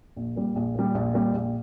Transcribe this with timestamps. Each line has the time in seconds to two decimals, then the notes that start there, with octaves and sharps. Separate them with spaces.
0.16 A#1
0.36 A#2 G3
0.55 A#1
0.75 A#2 G3
0.95 A#1
1.14 A#2 G3
1.33 A#1